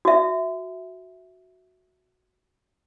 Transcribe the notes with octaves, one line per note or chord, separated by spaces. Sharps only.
F#4 E5